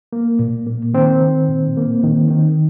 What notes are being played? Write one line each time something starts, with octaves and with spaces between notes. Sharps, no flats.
A#3
A#2
A#3
D#3 C4
D#3
A#2
A#3
D#3
D#3